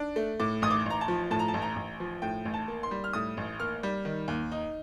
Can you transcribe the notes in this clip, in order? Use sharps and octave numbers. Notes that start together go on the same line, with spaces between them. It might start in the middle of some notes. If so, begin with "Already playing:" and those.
Already playing: D4
A3
A2 D6
A1 D#6
D6
A1 A#5
A5
F3
A2 A5
A#5
A5
A1
A#5
A1
F3
A2 G5
A1
A5
A#3
C6
G3
F6
A2 D#6
A1
A#3 F6
G3
D#3
D#2
D#4